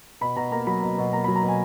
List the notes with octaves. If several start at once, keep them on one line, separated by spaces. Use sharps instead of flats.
B2 B5
B2 A#5
A#3 A#5
F#3 B5
B2
B2
A#3 A#5
B5
F#3
A#5
B2
G#5